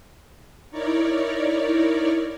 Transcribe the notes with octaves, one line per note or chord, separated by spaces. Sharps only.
D#4 E4 A#4 C#5 D5